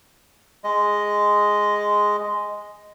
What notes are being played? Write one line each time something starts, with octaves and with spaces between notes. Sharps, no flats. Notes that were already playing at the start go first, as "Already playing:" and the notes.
G#3 D#5